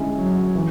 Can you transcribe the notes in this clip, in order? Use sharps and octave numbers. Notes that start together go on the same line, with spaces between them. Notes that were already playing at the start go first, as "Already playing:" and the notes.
Already playing: D3 G#3 C#4 E4
F#3
E3